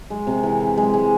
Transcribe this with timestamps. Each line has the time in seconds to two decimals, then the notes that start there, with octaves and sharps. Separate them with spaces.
0.10 G#3
0.27 C3
0.43 E3
0.61 E3
0.77 G#3
0.94 G#3